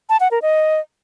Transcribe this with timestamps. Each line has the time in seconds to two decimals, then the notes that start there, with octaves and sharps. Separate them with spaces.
0.09 A5
0.20 F#5
0.31 A#4
0.42 D#5